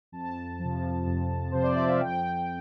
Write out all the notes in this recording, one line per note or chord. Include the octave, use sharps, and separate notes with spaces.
F2 A5
C3 F3
F2
C3 F3 C5
D5
E5
F5
F2 G5